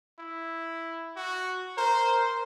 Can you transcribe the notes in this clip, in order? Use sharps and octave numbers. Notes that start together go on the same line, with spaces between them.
E4
F#4
A#4 C5